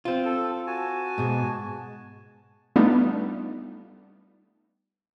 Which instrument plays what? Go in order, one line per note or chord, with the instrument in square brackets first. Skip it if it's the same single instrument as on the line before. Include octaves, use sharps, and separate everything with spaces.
[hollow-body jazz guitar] C4 F4
[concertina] A4
F#4 G#5 A5
[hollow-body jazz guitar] G#2 B2
[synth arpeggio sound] G3 A3 B3 D4 D#4 F4